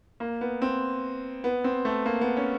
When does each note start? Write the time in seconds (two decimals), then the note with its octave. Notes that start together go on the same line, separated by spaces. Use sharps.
0.20 A#3
0.41 B3
0.62 C4
1.44 B3
1.64 C4
1.85 A3
2.06 A#3
2.21 B3
2.37 C#4